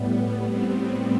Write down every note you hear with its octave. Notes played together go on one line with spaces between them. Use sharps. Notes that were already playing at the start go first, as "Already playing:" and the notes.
Already playing: A2 G3 B3
C4